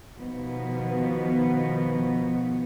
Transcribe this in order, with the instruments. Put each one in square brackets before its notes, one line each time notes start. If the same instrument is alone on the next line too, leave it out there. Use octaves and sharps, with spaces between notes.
[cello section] B2 D#3 F3 B3